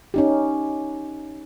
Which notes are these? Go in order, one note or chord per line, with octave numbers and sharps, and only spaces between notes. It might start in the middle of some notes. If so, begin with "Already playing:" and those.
C#4 D#4 G4